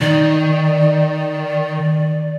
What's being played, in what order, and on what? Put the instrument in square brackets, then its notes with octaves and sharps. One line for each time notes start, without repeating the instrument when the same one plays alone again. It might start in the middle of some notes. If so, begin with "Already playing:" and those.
[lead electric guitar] D#3 [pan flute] D5